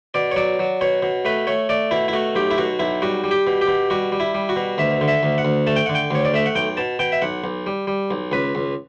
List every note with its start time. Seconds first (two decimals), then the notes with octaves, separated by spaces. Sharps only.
0.14 B2 D5
0.32 C#5
0.36 F#3 D5
0.59 F#3
0.81 B2 C#5
1.03 B2
1.25 A3 B4
1.47 A3 C#5
1.69 A3 D5
1.91 B2 E4
2.08 E4
2.13 A3 F#4
2.35 B1 G4
2.51 E4
2.58 B2 F#4
2.79 B1 E4
3.02 G3 F#4
3.24 G3
3.31 G4
3.47 B2
3.61 G4
3.68 B2
3.90 G3 F#4
4.12 G3
4.20 E4
4.35 G3
4.49 F#4
4.56 B2
4.78 D2 E5
5.01 D3
5.08 E5
5.23 D2
5.38 F#5
5.45 D2
5.67 A3 A5
5.76 G5
5.86 D3 F#5
5.95 G5
6.11 D2 C#5
6.25 D5
6.34 A3 E5
6.46 F#5
6.56 B1 G5
6.77 B2 A5
6.99 B2 G5
7.12 E5
7.22 B1 F#5
7.44 B1
7.67 G3
7.87 G3
8.11 B1
8.32 C#2 B4
8.55 C#2